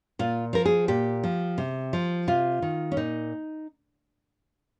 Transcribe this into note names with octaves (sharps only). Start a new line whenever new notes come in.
A#2 F4
F3 A#4
G#4
A#2 G4
F3
C3
F3
C3 F4
D#3
C#4
A#2 D#4